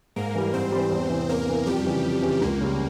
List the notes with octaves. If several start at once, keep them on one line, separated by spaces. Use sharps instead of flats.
G#2 A#3 A#4
E3 G3
G#2 C4 C5
E3 G3
E2
C3 E3
E2 A#3 A#4
C3 E3
F2 G3 G4
C#3 E3
F2
C#3 E3
C#2 A#3
C#3 G3